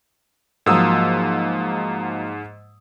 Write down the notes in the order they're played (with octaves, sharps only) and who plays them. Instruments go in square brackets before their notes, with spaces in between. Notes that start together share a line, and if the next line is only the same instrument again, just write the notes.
[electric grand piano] G#2 D#6 E6 [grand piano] F3 F#3 A#3